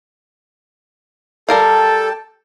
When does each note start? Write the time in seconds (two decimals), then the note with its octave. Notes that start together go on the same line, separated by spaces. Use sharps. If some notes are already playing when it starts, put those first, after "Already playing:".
1.49 G3 A4 A#4 F5 G5 A5